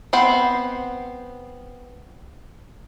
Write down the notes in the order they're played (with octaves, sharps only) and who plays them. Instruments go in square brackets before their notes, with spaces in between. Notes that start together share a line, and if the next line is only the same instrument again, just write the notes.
[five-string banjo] B3 C4 C5 F#5